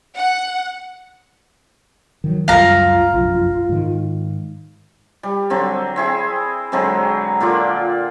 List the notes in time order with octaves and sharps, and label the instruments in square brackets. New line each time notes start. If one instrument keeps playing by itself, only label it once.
[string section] F#5
[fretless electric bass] D#3 E3 F#3
[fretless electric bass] C#2 F#2 G3 [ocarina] F4 [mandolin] F5 A#5
[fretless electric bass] F1 A#1 F#2
G#2 D#3
[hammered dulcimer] G3
D3 F#3 C4
C4 E4 G#4
D3 F#3 G#3 C4
A#2 D3 F4 D5